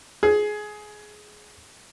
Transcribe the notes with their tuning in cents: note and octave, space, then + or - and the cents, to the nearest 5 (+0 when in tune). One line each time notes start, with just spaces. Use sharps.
G#4 +15